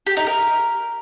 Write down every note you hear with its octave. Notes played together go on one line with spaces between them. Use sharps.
G4
D#4
A#4